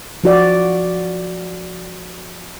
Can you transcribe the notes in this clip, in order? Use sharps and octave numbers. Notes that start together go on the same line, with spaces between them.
F3 F#4 D5